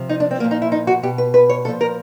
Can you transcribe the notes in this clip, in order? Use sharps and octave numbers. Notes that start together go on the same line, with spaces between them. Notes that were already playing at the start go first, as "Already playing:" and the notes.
Already playing: C3 F3
D#4
D4
C4
A#2 F3 A#3
D#4
E4
D#4
F#4
B2 G4
B4
B4
C#5
A#2 F3 A4
A#4